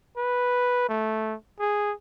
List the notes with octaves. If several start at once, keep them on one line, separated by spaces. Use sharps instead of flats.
B4
A3
G#4